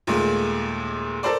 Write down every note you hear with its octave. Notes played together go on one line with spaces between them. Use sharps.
D#2 A#2 G#3 A3
A4 A#4 C5 D5